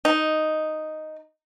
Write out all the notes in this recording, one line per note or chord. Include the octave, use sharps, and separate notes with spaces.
D#4